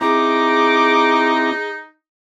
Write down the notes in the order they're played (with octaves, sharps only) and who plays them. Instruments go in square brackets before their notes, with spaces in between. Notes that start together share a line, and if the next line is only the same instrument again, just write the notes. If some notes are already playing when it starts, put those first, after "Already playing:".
[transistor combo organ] C4 E4 A#5 [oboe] D#4 [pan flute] G#4 [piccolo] D6